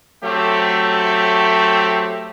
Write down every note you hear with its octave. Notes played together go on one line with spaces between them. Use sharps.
F#3 A3 C4 G4